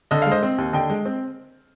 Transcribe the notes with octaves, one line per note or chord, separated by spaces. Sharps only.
D3 D#5
G#3 F5
C5 D#5
C4
D#2
D3 D#5 G5
G#3
C4